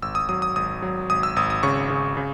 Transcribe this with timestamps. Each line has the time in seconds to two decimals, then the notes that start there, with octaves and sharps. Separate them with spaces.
0.02 G#1 E6
0.15 D#6
0.29 F#3 D#6
0.42 D#6
0.56 G#1 D#6
0.82 F#3
1.10 G#1 D#6
1.23 E6
1.36 G#1 D#6
1.50 D#6
1.63 C#3 C#6
1.90 C#3
2.17 C#3